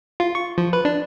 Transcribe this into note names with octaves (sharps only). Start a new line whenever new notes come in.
F4
C#6
F3
B4
D4